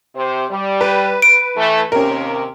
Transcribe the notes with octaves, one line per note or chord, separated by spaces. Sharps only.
C3 C5
G3
B4
D7
E3 A3
D#2 C3 C#4 A#4